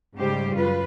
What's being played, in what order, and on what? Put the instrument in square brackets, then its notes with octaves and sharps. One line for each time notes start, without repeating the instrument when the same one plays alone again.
[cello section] G#2 C#3 G3 G4 C5
F#2 F4 B4